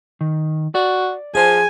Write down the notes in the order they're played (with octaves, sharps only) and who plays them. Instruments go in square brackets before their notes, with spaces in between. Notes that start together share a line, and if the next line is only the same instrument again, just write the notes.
[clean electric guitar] D#3
[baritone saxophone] F#4 [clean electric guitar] D5
[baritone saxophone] F3 [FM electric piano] G#4 C5 [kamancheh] G#5